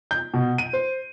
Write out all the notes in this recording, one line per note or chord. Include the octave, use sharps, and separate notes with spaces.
G6
B2
D#7
C5